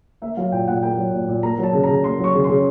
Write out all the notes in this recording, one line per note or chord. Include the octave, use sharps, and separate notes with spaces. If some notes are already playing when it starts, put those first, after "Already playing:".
A#3 E5
F#3 F5
A#2 G5
A#2 F#5
A#3 G5
F#3
A#2
A#2
A#3 A#5
F#3
A5
C#3
A#5
C#3
A#3 C6
F#3
C#6
C#3
C6
C#3